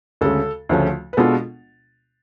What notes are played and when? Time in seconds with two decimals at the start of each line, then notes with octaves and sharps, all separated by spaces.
0.21 D2 C#3 G#3 A4
0.69 D2 C#3 F3 A3 C#4
1.13 B4
1.17 B2 G#3 B3 D4 F4 A4